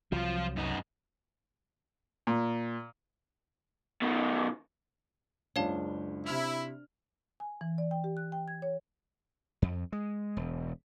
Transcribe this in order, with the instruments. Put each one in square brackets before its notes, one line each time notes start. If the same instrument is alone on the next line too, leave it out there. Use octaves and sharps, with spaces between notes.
[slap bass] C2 F#3 [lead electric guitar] F3 F4
[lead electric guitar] F#2 D#4
[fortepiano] A#2
[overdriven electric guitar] B2 D#3
[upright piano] F#1 C#2 G7 [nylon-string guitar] D4 [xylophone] C#5 F5 A5
[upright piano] C3 F6 F7 [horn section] E4
[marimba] G#5
E3
D5
G5
G4
F#6
G5
G#6
C#5
[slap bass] F2
G#3
E1